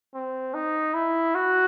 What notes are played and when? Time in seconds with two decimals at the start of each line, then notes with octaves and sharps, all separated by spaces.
0.14 C4
0.54 D#4
0.94 E4
1.35 F#4